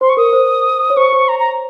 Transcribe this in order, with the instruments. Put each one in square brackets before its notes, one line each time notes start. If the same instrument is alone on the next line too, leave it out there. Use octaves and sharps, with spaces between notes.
[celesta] C5 [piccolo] C6
[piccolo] C#6
[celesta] A#4 [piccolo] D#6
[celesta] A#4
C5
C#5
[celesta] C5 [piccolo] C#6
[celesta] C5
[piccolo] A#5
A#5